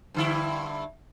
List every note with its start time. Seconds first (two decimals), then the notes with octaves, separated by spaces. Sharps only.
0.14 G2 D3 E4